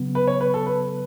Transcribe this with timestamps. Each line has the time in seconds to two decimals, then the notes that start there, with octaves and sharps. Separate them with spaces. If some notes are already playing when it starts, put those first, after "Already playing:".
Already playing: C#3 F#3 B3
0.15 B4
0.27 C#5
0.41 B4
0.54 A4
0.66 B4